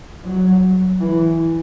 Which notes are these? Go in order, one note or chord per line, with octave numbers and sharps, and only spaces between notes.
F#3
E3